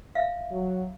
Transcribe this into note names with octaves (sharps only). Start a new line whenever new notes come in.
E5 F5
F#3